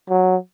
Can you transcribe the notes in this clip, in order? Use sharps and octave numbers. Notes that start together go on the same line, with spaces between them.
F#3